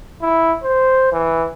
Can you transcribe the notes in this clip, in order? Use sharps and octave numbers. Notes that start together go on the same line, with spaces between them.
E4
C5
E3